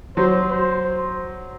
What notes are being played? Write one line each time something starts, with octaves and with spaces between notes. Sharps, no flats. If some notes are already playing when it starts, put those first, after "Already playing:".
F#3 C5
C5